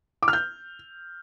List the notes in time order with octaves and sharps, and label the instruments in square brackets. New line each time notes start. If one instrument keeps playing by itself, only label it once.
[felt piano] D6
F6
G6